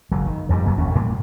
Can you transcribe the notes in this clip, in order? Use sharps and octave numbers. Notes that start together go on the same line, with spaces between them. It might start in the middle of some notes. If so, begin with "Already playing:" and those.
F#1 F#3
D#3
F2 G#2 E3 G3
A#1 F#2 F#3 A#3
E1 D#2 B2 C#4
A2 G3 G#3 A#3